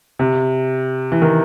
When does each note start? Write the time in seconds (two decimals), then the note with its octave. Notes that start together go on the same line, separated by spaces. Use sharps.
0.19 C3
1.12 E3
1.22 D#3